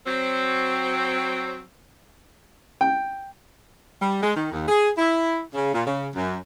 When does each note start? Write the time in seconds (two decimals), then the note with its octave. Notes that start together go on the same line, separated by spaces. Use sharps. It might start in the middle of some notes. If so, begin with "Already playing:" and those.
0.07 F#3 C4
2.81 G5
4.02 G3
4.23 G#3
4.36 D#3
4.52 D#2
4.68 G#4
4.98 E4
5.54 C#3
5.74 A#2
5.86 C#3
6.15 F#2